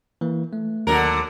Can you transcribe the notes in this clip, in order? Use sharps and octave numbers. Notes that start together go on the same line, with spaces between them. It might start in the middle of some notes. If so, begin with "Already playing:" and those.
E3 A#3
A3
D#2 D3 F#3 A#4